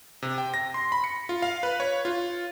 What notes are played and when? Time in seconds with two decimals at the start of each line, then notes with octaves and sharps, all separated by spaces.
0.22 C3
0.38 G5
0.54 A#6
0.74 C6
0.92 B5
1.04 C#7
1.29 F4
1.42 F5
1.63 B4
1.80 C#5
2.05 F4